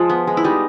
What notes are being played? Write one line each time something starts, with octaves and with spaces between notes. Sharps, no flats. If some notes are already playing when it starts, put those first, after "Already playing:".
Already playing: F3 G#3
B3
G#3
E4
G3 D#4